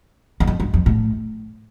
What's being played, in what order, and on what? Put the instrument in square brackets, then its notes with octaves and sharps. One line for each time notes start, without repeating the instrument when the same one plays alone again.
[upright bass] E2
F2
G2
F2
A2